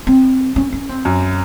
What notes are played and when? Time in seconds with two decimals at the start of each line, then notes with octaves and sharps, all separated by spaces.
0.07 C4
0.56 C#4
0.72 C#4
0.89 C4
1.05 F#2